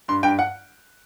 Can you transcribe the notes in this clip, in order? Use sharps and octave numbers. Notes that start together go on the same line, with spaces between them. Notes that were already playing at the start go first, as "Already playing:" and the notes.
G2 C6
G2 G5
F#5